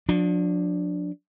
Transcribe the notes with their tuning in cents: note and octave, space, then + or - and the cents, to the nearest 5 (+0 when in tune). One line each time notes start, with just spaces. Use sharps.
F3 +45 D4 +0